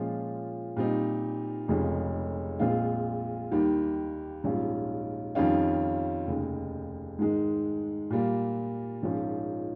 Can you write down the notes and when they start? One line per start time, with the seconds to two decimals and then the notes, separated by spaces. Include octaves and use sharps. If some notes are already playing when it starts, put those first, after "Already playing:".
Already playing: A#2 F3 G#3 C#4 F4
0.76 A#2 G3 C4 D#4
1.68 F1 F2 C#3 G#3 C#4
2.60 A#1 A#2 G#3 C4 F4
3.51 D#2 D#3 G3
4.44 A#1 G#2 G3 C#4 F4
5.35 F2 D#3 G3 C#4 F4
6.27 F1 D#2 C#3
7.19 G#2 D#3 G#3
8.10 A#2 G3 A#3
9.03 A#1 G#2 F3 A#3 C#4